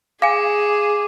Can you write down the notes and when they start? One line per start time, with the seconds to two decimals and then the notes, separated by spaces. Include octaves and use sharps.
0.22 G#4 F5 G#5 D6